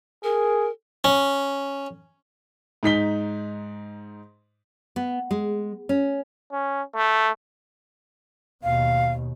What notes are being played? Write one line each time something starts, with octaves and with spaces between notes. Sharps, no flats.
G#4 A#4
C#4
G#2 D#4 B6 G7
B3
G#3
C#4
C#4
A3
D#2 B2 F5